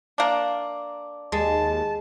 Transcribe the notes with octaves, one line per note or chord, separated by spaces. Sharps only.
A#3 D4
D#2 G#3 A5